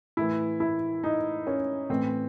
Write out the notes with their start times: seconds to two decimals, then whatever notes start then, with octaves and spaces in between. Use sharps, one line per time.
0.17 A2 E3 E4
0.60 E4
1.04 D#4
1.47 C#4
1.90 A2 E3 C4